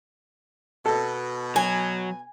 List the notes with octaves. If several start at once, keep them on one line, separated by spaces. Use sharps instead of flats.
B2 A4
F#3 G#5